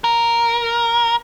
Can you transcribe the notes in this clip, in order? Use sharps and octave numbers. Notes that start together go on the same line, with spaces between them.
A#4